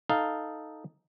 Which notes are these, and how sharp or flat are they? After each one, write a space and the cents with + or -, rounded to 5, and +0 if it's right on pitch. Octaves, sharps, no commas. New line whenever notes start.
D#4 +0 A4 +0 F5 +0